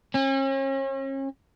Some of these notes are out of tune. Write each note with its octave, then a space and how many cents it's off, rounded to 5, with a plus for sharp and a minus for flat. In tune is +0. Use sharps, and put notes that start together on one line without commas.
C#4 -40